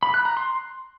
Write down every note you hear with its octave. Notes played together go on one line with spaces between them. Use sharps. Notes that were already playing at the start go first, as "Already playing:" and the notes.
B5
F#6
A#5
C6